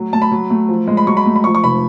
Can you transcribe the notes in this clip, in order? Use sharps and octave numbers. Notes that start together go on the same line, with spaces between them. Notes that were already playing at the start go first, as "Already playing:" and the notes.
Already playing: F#3 A3
A3 A5
B5
F#3
A3
F3
G#3
B5
F#3 C#6
B5
A3
B5
F3 C#6
C#6
F1 B5